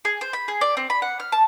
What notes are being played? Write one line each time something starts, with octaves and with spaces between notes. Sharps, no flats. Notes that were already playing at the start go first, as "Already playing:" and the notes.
G#4
C5
B5
G#4
D5
C4
B5
F#5
F6
A5